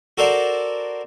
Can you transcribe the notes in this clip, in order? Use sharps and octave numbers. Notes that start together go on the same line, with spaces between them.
F#4 A4 A#4 C5 D5 F#5